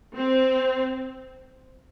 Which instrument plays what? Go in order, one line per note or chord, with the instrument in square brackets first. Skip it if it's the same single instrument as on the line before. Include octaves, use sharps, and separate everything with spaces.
[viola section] C4